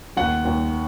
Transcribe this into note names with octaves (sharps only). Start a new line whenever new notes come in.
D#2 F#5
D#2